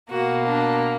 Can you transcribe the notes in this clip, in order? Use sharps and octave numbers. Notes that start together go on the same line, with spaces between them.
B2 A#3 F#4
D4